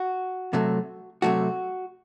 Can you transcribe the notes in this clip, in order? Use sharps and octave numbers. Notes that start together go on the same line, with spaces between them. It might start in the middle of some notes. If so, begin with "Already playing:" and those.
Already playing: F#4
C3 F#3 A3
C3 F#3 A3 F#4